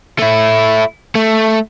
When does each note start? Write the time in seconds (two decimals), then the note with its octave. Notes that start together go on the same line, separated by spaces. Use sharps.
0.19 A3 E4
1.15 A3